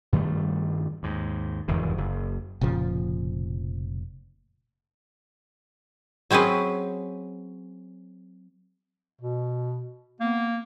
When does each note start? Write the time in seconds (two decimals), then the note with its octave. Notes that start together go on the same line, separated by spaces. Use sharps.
0.13 G2 D#3 G3 A3
1.03 D#2 G#2
1.68 F1 E2 G#2 D#3
1.98 F#1
2.61 F1 A#2 C#3 F3
6.31 F#3 C4 C#4 G#4 B4
9.21 B2
10.20 A#3 B3